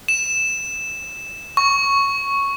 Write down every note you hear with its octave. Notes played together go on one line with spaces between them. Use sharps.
E7
C#6